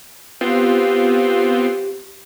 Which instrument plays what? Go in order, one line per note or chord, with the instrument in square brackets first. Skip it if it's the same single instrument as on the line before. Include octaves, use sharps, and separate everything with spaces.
[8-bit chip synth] B3 C4 F4 [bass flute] G4